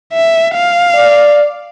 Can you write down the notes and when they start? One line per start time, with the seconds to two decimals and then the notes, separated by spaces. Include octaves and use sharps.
0.13 E5
0.55 F5
0.94 D5